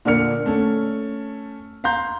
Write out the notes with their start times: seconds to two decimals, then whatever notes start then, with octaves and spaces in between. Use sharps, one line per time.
0.05 A#2 D3 D4 A#4 F6 C#7
0.46 A3 C#4 A4
1.84 F5 A#5 C6 G6